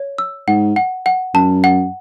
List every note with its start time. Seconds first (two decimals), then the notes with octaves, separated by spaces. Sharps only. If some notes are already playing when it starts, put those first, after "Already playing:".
Already playing: C#5
0.18 E6
0.48 G#2 F#5
0.76 F#5
1.06 F#5
1.34 F#2 A5
1.64 F#5